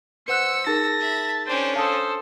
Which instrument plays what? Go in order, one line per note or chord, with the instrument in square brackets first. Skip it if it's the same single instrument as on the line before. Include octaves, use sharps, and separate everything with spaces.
[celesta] B4 F#5 F#6 [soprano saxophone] C5 [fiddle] E6 [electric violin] C#7
[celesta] D#4 G#4 A#4 [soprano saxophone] A5 [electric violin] A#6
[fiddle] E5 B5
[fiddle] C#4 D4 [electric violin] C5 G5
[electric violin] A4 C5 [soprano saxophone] F5 [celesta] A5 D#6